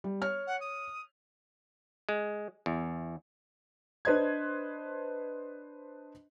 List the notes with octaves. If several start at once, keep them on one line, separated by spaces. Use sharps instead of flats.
G3
C#5 F6
F#5
D#6
G#3
E2
D4 B4 C5 D#5 G#6